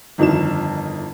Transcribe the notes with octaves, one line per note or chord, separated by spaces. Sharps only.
G1 F2 D#3 E4 E7